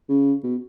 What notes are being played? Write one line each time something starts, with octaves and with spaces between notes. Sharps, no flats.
C#3
B2